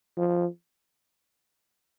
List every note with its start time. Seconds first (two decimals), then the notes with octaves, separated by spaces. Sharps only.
0.17 F3